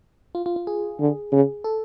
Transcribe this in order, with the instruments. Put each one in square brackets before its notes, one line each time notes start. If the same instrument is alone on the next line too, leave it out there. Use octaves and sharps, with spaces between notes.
[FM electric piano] F4
F4
F4
G#4
[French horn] D3
C#3
[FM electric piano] A4